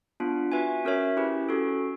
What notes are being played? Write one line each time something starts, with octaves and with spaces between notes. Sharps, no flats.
B3 D4 F4
F#4 B4 E5 G#5
C#4 F#4 A#4 C#5 E5
C#4 E4 G4 B4
C#4 F#4 A4